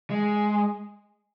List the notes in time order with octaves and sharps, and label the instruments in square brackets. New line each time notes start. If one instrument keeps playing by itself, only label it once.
[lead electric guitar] G#3